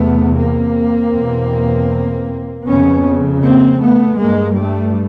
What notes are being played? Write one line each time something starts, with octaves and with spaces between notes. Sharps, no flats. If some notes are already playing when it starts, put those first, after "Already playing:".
Already playing: E2 C3 A3 B3
A#3 C4
E2 B2
F2 C#3 B3 C#4
A#3 C4
A3 B3
G2 G#3 A#3
G3 A3